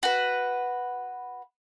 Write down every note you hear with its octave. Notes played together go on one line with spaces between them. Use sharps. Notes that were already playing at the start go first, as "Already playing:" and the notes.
F#4 B4